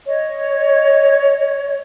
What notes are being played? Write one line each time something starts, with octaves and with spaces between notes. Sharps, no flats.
C#5 D#5